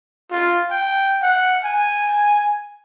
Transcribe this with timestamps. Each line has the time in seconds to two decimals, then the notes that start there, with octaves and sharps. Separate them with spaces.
0.31 F4
0.71 G5
1.22 F#5
1.64 G#5